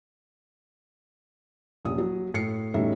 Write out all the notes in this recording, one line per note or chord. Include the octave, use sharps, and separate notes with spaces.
D#1 A#1 C#4 D#6
F#3
A2 C7 C#7
E1 A2 G3 C#4 D#4 E5